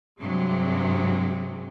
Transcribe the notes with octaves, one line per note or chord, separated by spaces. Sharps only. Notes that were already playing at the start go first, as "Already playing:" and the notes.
G2 C3 F#3 G#3